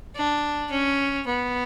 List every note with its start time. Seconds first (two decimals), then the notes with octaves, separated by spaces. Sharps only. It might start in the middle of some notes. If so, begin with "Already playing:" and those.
0.15 D4
0.71 C#4
1.27 B3